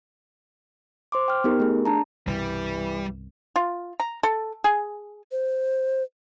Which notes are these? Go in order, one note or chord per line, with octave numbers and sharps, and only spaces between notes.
C5 C6 D6
G5 F6
B3 D#4 G4 A#4
A3 G#4
D4 A5 A#5
C2 G2 B2 E3 G3
F4
A#5
A4
G#4
C5